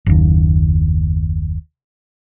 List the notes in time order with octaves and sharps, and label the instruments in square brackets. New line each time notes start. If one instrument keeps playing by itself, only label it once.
[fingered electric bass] F#1 D#2